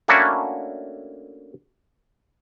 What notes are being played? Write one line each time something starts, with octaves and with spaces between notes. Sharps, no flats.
A3 A#3 C#4 D4 E4 F#4